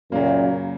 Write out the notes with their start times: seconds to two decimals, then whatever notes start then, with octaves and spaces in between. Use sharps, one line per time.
0.12 F#2 A#2 C#3 F#3 A#3